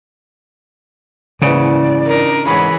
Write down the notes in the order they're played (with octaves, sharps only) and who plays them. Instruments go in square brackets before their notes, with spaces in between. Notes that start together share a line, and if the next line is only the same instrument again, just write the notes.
[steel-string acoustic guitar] G#2 E3 [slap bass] C#3 [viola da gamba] A#3 [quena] D5
[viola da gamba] D4 D#4 A#4
[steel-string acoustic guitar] D2 G#2 [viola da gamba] E3 G#4 C#5 [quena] B5